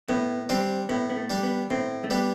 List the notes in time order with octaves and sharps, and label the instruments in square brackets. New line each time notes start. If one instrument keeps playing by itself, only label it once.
[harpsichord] A2 [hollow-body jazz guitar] B3
[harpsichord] G3 D4 [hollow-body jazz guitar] C4
[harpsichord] A2 [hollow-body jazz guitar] B3
[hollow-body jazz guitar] B3
A3
[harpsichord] G3 D4
[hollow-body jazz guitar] B3
[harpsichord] A2 [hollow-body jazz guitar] C4
[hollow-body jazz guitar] A3
[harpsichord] G3 D4 [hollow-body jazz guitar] B3